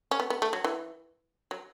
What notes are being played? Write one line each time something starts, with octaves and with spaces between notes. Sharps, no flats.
C#4
B3
B3
A3
F#3
E3
F#3